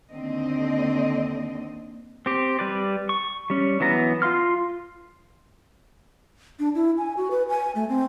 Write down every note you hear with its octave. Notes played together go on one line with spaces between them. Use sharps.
D#2 D3 C4 D#5
C4 G4
G3 B4 D5
C#6
G3 C#4
E3 F#3 B3 A#5
F4 F5 C6 F6
D4
E4
G#5
F#4
B4
G#5
A3
C4